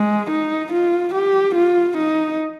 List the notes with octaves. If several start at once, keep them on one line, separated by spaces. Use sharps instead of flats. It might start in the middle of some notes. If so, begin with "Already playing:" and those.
Already playing: G#3
D#4
F4
G4
F4
D#4